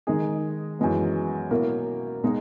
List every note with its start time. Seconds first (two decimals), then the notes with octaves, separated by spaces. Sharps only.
0.07 D#3 G#3 D#4 G#4
0.79 F#2 E3 G#3 B3
1.51 B2 A#3 E4 A#4
2.23 B2 G#3 D#4